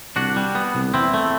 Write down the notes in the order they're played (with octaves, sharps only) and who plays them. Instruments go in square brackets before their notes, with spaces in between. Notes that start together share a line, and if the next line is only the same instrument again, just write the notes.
[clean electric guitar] C2 D4 F#4
G3
B3
C2
E2 C4 E4
A3